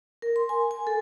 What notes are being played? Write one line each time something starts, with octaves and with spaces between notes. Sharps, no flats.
A#4
C6
G#5
G#5
A4